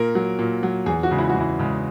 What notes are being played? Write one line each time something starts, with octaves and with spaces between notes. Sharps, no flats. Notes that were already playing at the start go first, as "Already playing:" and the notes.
Already playing: A#2 A#4
F#3
A#2
F#3
E2 G#4
F#4
C#3 G#3
E4
F#4
E2
E4
C#3 G#3